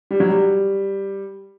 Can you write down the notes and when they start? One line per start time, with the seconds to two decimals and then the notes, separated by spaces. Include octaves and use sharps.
0.11 G3
0.20 F#3
0.29 G3